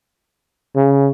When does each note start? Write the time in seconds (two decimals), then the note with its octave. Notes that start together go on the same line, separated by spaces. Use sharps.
0.76 C#3